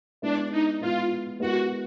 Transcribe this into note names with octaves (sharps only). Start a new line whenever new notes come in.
G#3 B3 D4 E4
D#4
G#3 B3 E4 F4
G#3 B3 E4 F#4 G4 A#4